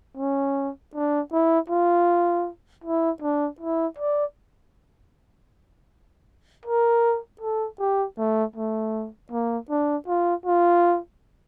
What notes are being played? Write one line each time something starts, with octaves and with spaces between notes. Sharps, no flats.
C#4
D4
E4
F4
E4
D4
E4
D5
A#4
A4
G4
A3
A3
A#3
D4
F4
F4